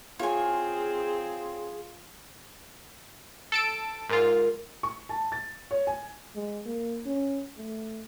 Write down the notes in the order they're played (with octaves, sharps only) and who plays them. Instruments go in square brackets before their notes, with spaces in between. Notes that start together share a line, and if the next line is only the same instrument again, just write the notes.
[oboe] C4 [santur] F4 [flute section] G#4 [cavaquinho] C#5 G#5
[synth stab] A4 A5 D7
[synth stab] G#2 F4 [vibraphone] A#4
[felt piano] C#6
A5
A6
C#5
G#5
[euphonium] G#3
A#3
C#4
A3